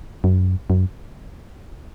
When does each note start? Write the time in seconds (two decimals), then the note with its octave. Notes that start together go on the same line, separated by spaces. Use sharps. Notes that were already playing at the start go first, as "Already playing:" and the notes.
0.24 F#2
0.70 F#2